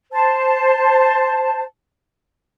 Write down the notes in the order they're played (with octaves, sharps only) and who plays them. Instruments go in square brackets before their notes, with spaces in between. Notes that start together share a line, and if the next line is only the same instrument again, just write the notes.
[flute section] C5 A5